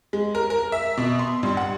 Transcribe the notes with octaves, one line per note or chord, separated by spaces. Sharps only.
G#3
A#4
A#4
E5
B2
C6
G2
F#5